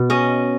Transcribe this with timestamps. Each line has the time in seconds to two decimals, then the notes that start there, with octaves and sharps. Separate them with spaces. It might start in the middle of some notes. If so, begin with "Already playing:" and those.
Already playing: B2
0.10 C#4 D#5